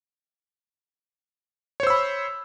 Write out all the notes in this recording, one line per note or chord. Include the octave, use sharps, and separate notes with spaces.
C5 C#5 B5 E6